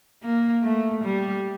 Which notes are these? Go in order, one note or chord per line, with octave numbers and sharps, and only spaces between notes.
A#3
A3
G3